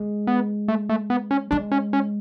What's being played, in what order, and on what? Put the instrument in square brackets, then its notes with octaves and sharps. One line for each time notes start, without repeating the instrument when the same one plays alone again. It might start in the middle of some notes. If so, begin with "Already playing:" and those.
Already playing: [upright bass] G#3
[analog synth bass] B3
A3
A3
B3
C#4
[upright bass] G#3 [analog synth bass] D4
[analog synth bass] C#4
C#4